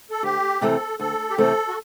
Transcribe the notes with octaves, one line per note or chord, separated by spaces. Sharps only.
A4
D2 G4
C3 E3 A3 C4 A4
D2 A4
G4
C3 E3 A3 C4 A4
F#4